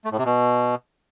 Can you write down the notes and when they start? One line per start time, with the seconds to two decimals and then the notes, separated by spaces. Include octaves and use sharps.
0.05 A3
0.12 A2
0.18 C3
0.25 B2